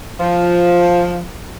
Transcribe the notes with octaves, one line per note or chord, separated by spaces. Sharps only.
F3